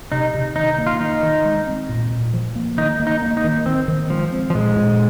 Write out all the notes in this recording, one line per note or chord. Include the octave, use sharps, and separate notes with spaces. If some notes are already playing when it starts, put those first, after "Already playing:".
C3 D#4
C3
D#3 D#4
A#3
F4
D#3 D#4
D#3
G#3
C4
A#2
A#2
F3
A#3
D#3 D#4
A#3
D#4
A#3
D#4
D#3
D#3 C4
D#3
F3 G#3
C4
F3
A#2 G#3
A#2